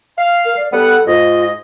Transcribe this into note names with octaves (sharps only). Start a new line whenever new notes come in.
F5
A#4
D5
G3 B3 A4 F#5
G#2 F4 D#5